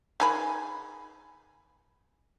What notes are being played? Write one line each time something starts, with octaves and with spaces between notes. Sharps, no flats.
D#3 G#4 B5